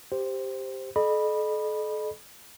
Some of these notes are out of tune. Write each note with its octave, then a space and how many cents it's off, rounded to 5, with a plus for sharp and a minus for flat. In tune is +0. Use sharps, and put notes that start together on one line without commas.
G4 +0 C5 +0
A4 -40 D#5 -40 B5 -10